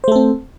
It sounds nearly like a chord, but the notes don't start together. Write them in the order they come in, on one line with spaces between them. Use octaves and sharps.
C5 A3 A4 C4